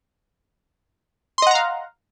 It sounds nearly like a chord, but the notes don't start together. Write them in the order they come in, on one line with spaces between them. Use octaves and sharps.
C6 D#5 F#5 A#5 F5